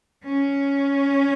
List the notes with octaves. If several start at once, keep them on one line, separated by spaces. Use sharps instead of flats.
C#4